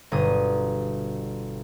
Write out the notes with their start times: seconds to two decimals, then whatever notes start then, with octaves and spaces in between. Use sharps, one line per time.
0.12 G1 B2 D#6